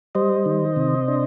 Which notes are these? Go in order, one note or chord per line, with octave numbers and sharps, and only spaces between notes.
G3 C5 D#5
D#3
C3
D4